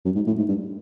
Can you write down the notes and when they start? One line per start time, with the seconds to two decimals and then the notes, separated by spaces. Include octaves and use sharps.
0.05 F#2
0.15 G#2
0.27 A2
0.38 G#2
0.48 G2